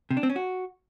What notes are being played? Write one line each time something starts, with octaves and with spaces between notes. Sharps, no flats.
C3
D4
C4
C#4
F#4